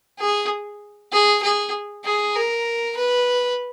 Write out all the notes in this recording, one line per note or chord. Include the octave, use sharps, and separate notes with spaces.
G#4
G#4
G#4
G#4
A#4
B4